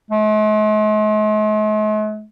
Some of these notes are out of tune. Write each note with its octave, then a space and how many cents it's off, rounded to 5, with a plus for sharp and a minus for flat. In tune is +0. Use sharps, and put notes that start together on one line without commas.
G#3 +45